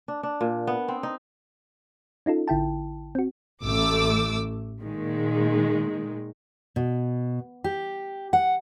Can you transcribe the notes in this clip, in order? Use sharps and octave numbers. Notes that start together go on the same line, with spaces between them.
D4
D4
A#2
B3
C4
D#4
C#4 D#4 F4 A4
A1 D3 E4 G5 A5
C4 F#4
A1 A3 D6 E6
A#2 D#3 G#3
B2
G4
F#5